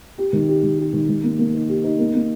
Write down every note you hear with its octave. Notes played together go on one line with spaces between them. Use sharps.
G4
D#3
G4
D#3
G4
D#3
D#3
A#3
A#3
D#4
G4
D#4
A#3
A#3